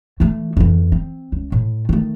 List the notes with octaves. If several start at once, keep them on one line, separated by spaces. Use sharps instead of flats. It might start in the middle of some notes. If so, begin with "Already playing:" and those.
E3 A3
F2 E3
C4
C#2
A2
D#3 A3